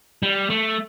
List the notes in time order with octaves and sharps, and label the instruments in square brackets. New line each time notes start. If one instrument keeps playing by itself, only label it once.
[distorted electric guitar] G3
A3